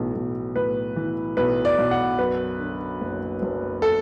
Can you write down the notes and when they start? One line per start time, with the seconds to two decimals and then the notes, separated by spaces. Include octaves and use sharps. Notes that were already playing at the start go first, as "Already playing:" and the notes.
Already playing: B1 A2 E3
0.15 B1
0.56 A2 B4
0.96 E3
1.37 B1 B4
1.65 D5
1.78 B1
1.91 F#5
2.19 F#2 B4
2.60 D3
3.01 F#1
3.42 F#1
3.82 A4